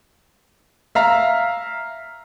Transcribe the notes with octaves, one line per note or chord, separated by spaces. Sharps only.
E5 F5 A#5